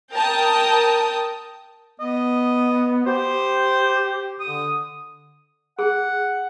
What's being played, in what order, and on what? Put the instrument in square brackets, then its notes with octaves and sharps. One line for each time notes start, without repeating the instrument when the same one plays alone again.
[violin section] A#4 G5 A5 D#6
[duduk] B3 [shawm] D#5
[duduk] G4 [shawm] C5
[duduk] D3 [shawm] D#6
[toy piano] G#4 [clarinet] F#5